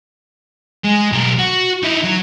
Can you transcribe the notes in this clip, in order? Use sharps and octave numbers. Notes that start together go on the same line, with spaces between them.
G#3
B1 A#4
F#4
D#4 E4
F#3